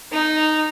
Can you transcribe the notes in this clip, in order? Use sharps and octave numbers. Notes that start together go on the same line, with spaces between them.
D#4